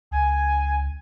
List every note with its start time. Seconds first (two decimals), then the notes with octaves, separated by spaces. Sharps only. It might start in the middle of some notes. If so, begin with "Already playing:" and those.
0.11 C#2 G#5